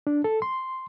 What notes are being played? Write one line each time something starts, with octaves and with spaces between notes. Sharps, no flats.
D4
A4
C6